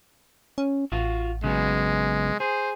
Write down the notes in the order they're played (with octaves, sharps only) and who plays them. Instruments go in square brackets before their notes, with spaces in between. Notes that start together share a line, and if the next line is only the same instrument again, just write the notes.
[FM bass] C#4
[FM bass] A1 [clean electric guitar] F4 F#4
[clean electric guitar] C#3 F#3 B3 [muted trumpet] G#3
[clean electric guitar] G#4 [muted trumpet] C5